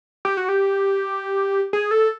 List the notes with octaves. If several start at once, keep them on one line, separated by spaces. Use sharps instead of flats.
G4
F#4
G4
G#4
A4